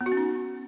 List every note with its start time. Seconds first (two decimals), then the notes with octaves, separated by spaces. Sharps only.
0.01 B3
0.06 F#4
0.12 C#4
0.17 D#4